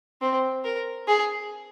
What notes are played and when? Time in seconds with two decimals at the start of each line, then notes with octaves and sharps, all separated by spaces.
0.21 C4
0.65 A#4
1.08 G#4